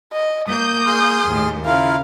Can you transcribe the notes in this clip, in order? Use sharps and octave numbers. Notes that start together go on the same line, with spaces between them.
D#5
A#3 D#6 G6
G#4 C6 F6
D#2 A2
C#3 E4 F4 A#4 F5